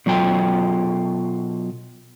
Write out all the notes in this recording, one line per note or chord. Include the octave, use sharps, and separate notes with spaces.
B2 F#3 F4 A4 G5